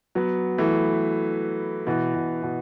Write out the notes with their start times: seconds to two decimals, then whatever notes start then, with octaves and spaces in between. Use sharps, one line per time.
0.15 F#3 B3
0.58 E3 A3
1.87 B2 E3
2.15 B2
2.43 B2